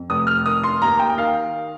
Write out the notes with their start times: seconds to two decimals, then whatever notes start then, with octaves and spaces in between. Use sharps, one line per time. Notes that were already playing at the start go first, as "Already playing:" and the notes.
Already playing: F2
0.09 F1 D#6
0.27 F6
0.46 D#3 D#6
0.63 C6
0.82 D#2 A#5
0.99 G5
1.10 G5
1.18 D#3 F5